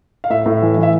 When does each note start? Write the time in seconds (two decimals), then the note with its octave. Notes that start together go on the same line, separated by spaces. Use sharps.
0.24 F5
0.30 A2 E5
0.46 A2
0.62 E3
0.77 E3
0.83 E5